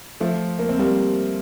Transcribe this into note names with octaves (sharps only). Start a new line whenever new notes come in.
F3 A3
A#3
C4
G3 A#3